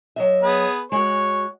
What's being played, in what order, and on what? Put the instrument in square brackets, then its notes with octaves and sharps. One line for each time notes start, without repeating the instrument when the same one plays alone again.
[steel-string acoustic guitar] F#3 D#5 E5
[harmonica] B3 G#4 B4
[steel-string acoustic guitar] G#3 F#4 [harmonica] C#5